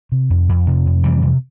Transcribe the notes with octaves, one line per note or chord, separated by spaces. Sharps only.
C3
F2
F2
C3 F3
F2
C3 E3 G3
C3